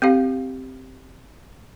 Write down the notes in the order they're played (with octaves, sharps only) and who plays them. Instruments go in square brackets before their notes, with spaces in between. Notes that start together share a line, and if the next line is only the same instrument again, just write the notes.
[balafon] C4 G4 F5